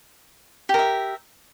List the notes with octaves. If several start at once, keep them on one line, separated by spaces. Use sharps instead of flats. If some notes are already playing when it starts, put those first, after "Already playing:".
G4 A#4 E5